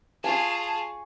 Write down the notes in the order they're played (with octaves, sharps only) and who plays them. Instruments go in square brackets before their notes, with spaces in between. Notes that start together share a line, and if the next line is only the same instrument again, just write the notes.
[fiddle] F4 G#4 [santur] G#5 C#6 [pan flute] A5